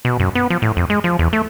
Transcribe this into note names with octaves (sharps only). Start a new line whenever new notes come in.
B2
F#2
B3
F3
A2
F2
G#3
F3
E2
A3